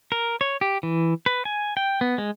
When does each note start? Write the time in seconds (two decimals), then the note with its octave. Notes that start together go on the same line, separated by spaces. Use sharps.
0.12 A#4
0.41 C#5
0.61 G4
0.83 E3
1.26 B4
1.45 G#5
1.77 G5
2.01 B3
2.18 G#3